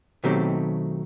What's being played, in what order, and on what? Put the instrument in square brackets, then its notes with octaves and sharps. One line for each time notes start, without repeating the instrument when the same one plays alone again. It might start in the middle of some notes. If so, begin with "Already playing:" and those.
[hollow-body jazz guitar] B2 D#3 F#3 A3 C4 G4